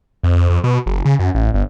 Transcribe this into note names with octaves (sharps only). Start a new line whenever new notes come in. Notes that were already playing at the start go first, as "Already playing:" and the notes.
F2
F2
F2
B2
F#1
C#3
F#2
A1
G1